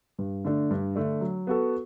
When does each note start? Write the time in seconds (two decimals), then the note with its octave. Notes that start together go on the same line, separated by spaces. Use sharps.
0.19 G2
0.45 D3 A3 D4
0.71 G2
0.96 D3 A3 D4
1.21 F#3
1.47 B3 F#4 A4